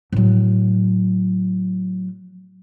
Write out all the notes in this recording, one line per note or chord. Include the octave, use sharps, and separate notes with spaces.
A2 F#3